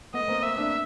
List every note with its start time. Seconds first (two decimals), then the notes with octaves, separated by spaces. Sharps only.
0.14 A3 B3 D#5
0.28 A#3 C4
0.42 A#3 C4 E5
0.57 C4 D4